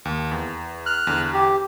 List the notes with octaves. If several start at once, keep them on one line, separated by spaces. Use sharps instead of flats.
D#2
E2
F6 F#6
E2 D3
G4